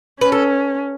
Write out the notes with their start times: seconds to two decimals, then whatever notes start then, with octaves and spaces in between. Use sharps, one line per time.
0.21 C#4 B4
0.32 A4